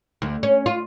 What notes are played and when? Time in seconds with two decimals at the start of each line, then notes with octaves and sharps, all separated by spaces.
0.22 D2
0.43 C#4
0.66 F4